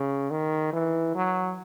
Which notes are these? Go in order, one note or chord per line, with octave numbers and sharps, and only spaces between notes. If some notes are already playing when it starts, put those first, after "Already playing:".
Already playing: C#3
D#3
E3
F#3